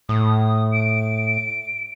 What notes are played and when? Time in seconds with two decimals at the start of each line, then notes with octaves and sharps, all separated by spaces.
0.09 A2 D#6
0.72 D7